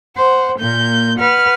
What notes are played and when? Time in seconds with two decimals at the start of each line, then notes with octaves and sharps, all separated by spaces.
0.17 C5 F#5
0.60 A#2 A#3 G6
1.19 B4 F#5 F6